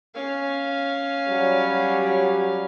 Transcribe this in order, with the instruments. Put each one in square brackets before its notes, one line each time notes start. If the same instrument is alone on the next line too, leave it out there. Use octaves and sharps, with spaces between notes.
[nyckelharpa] C#4 F5
[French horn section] F#3 G3